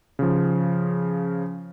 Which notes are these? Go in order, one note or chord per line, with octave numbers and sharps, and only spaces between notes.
C#3 F3